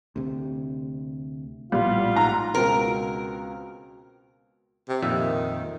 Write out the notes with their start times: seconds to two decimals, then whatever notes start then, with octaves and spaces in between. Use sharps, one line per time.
0.16 D2 C3
1.72 A#1 A2 G3 B3 F4
2.16 G#2 A#5
2.54 C#2 B2 C4 A#4
4.89 C3
5.02 F2 A#2 D#3 E5